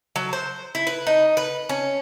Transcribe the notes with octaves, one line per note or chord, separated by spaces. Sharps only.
F#3
C5
E4
B4
D#4
B4
C#4